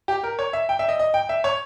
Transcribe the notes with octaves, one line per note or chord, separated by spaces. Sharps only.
G4
A#4
C#5
E5
G5
E5
D#5
D#5
G5
E5
C#5